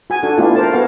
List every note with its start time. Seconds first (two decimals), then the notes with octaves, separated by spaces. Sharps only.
0.10 F#4 G#5
0.23 D4 F#4 A4
0.38 A3 B3 D4 E4 F4 G4
0.55 A#4 C5 A5
0.73 B3 F#4 C#5 F5